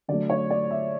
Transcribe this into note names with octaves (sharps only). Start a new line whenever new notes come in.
D3 F#3 A3 D5
C#5
D5
E5